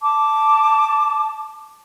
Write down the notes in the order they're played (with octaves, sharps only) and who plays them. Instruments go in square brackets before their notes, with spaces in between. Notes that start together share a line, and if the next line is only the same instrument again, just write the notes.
[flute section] A5 D6